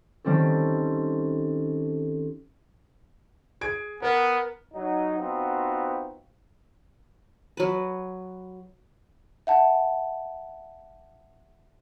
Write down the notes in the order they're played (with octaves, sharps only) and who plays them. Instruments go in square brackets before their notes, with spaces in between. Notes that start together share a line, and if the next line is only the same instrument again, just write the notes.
[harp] D#3 G3 C4 C#4 A4
[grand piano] G#4 G#6 D7
[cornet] B3 [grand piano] A#4
[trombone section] F#3 D#4
B3 C4 D#4 F4 F#4
[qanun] F#3 B4
[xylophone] E5 F#5 A5